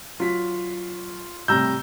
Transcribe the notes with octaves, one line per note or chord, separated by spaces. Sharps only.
F#3 F4 B6
A2 C3 G3 A#5 E6 G6